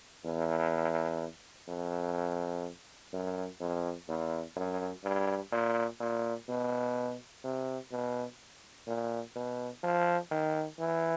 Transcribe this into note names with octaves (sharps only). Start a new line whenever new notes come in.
E2
F2
F#2
F2
E2
F#2
G2
A#2
A#2
B2
C3
B2
A#2
B2
F3
D#3
E3